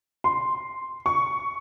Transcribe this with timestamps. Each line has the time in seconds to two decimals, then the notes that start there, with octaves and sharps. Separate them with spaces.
0.24 C6
1.06 C#6